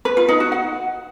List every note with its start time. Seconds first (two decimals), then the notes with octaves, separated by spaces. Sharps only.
0.05 B4
0.17 F4
0.29 D#4
0.40 F#4
0.52 F#5